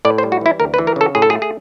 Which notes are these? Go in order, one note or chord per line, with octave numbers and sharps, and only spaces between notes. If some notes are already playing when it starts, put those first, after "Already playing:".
A2 D5
C5
G3
F#4
E3 E4
D2 A#4
B4
E3
A#4
C#3 A4
A2 G#4
A4
G#4
A3
G#4